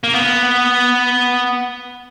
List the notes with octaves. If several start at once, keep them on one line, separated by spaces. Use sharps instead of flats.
A#3
B3